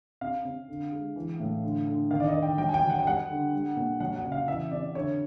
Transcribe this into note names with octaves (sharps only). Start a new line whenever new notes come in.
C3 F5
C3
D3
G#3
E3
A2
D3
D3
D#3 F5
D5
D#5
D#3
G5
F#3 G5
G#5
G5
F#3
F#5
G5
G3 F#5
D3
G3
A#2
F#3 F#5
F#5
C#3
F5
E3 E5
C3 D5
D3 C#5